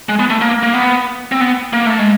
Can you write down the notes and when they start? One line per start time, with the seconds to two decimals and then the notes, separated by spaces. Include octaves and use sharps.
0.09 G#3
0.19 B3
0.30 A3
0.41 A#3
0.63 A#3
0.74 B3
1.32 C4
1.41 B3
1.73 A#3
1.86 A3
1.99 G#3